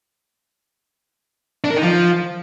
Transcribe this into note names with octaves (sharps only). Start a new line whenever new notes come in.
D4
A#4
D#4
F3